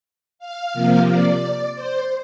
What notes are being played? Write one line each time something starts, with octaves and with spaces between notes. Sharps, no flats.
F5
C3 F3 A#3
D5
C5